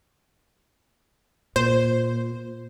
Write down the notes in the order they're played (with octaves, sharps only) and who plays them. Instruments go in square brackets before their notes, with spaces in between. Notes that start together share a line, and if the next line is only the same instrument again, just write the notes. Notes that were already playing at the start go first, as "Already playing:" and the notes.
[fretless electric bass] A#2 [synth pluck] C5